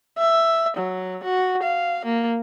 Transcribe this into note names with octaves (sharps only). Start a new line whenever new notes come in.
E5
F#3
F#4
F5
A#3